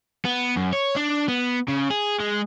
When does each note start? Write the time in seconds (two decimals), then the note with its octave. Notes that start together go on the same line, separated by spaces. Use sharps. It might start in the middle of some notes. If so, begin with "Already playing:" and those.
0.25 B3
0.57 F#2
0.73 C#5
0.96 D4
1.28 B3
1.68 C#3
1.91 G#4
2.20 G#3